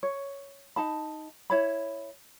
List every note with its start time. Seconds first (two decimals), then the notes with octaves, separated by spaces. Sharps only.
0.03 C#5
0.76 D#4 A5 B5
1.50 E4 C#5 B5